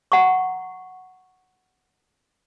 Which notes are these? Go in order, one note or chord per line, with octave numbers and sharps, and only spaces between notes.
F#5 A#5 C#6